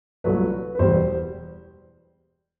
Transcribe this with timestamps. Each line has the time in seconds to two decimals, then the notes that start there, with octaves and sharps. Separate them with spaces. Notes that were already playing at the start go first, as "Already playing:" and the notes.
0.24 C2 A#2 F#3 A3 B4
0.75 B4
0.79 E1 E2 B2 G3 C5